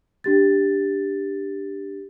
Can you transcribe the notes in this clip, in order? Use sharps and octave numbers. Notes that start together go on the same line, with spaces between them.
D4 G4 A6